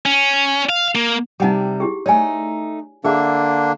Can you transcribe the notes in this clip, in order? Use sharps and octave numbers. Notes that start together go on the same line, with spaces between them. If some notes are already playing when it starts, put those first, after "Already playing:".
C#4
F5
A#3
C3 G3 D#4 F#5 D6
E4 G4 G#4
A3 D#4 C#5 D5 G#5
D3 A#3 D4 G#4 E5